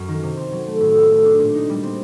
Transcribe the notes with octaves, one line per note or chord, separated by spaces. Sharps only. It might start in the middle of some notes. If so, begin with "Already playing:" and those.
Already playing: F#2 F#3
D#3
C3
C4
F#3
A3
A2
G4
A3
D4
A#2
D#4
G3
C4